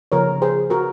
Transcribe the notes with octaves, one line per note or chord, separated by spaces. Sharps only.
C#3 F3 A#3 C#4 A#4 C#5
G#4 C5
F#4 A#4